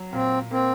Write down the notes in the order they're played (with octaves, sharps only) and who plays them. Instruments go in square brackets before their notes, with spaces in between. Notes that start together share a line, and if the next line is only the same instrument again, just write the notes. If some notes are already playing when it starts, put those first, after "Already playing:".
Already playing: [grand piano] F#3
[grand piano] A#2 [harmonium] C4
[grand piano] A#3 [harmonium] C4